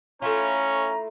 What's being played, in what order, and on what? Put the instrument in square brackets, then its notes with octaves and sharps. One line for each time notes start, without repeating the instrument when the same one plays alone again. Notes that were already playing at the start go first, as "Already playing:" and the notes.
[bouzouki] A3 E4 F4 [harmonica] C#4 C#5 [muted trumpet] A#5